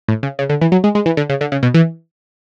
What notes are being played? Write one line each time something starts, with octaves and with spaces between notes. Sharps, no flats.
A2
C#3
C#3
D3
E3
F#3
G#3
G#3
E3
D3
C#3
D3
C#3
B2
E3